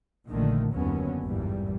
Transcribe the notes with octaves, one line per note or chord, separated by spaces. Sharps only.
A#1 A#2 D3 D#3 A3
F#1 D#2 D3 F#3 B3 C#4
G#1 E2 G2 A#2 E3 G3